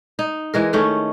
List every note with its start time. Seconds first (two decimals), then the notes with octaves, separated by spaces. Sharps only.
0.19 D#4
0.54 E3 G#3 A#4
0.73 D#3 A3 C#4